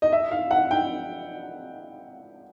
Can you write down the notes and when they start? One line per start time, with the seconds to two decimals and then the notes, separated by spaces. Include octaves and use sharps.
0.02 D#5
0.12 E5
0.31 F5
0.51 F#5
0.71 G5